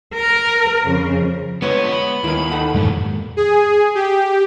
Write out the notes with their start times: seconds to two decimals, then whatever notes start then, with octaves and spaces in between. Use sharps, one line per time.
0.14 A#4
0.84 F2 C#3
1.62 D3 G#3 B3 F4 B4 C#5
1.92 B5
2.24 D#2 E4 A#4
2.52 D#4 A4 F#5
2.74 F2 G#2 B2 E3 G#3
3.37 G#4
3.95 G4